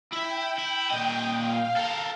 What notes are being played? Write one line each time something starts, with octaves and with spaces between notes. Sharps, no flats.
E4 E5 G5
E4
A#2 D#5
F5
A4 A#4